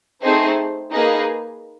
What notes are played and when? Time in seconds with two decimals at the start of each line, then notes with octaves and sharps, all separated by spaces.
0.22 A3 C4 D#4 G#4 C5
0.93 A#3 D#4 G#4 B4 D#5